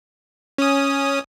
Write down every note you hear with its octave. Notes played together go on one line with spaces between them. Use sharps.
C#4 D#6